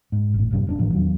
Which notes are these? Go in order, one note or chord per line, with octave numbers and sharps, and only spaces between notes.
G#2
G1 A2
A#1 G2 C3
E1 C4 D4
A1 A2 D#3 F3
E2 D#3 F#3